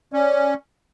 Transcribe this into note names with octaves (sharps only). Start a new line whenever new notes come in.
C#4 D5